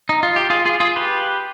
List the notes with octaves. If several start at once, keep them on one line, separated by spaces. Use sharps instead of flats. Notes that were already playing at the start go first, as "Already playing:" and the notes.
D#4
F4
G4
F4 G#4
F4 G#4
F4 G#4
G4 B4